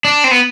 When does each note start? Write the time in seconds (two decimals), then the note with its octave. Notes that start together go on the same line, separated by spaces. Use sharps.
0.05 D4
0.24 C4
0.31 B3